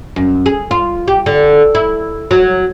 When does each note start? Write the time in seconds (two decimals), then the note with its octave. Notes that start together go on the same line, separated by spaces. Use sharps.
0.16 F#2
0.46 G#4
0.71 F4
1.08 G4
1.26 D3
1.75 E4
2.31 F#3